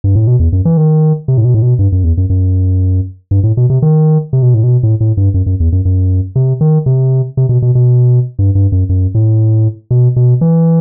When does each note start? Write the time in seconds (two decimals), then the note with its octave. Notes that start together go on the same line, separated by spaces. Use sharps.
0.04 G2
0.15 A2
0.27 B2
0.39 E2
0.52 F#2
0.65 E3
0.77 D#3
1.28 C3
1.38 A2
1.45 B2
1.54 A2
1.62 B2
1.79 G2
1.92 F#2
2.04 E2
2.17 F#2
2.30 F#2
3.31 G2
3.43 A2
3.57 B2
3.70 C3
3.82 D#3
4.33 C3
4.43 B2
4.54 A2
4.63 B2
4.83 A2
5.00 A2
5.17 G2
5.34 F#2
5.46 F#2
5.60 E2
5.72 F#2
5.85 F#2
6.36 C3
6.61 D#3
6.86 C3
7.37 C3
7.49 B2
7.62 B2
7.75 B2
8.39 G2
8.55 G2
8.72 F#2
8.89 F#2
9.15 A2
9.91 B2
10.16 B2
10.41 E3